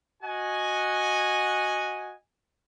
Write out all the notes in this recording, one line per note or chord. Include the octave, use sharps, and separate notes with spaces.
F#4 D#5 F#5 G#5